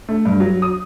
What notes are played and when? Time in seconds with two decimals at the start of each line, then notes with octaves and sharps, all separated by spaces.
0.09 A3
0.25 G2
0.40 F#3
0.62 D#6